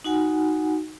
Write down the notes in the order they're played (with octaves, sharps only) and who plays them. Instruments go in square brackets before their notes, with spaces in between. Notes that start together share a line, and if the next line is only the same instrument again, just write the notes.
[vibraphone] D#4 F#4 F#5 G#5